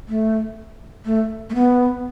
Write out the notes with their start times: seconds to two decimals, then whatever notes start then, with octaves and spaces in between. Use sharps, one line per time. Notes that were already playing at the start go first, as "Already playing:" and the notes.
0.09 A3
1.05 A3
1.50 A3
1.55 B3